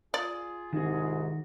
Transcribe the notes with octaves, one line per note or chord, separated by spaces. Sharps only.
F4 G#4 D5
C2 G#2 D#3 F#4